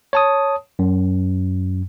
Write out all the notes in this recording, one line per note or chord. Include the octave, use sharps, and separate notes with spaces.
C#5 A5 D#6
F#2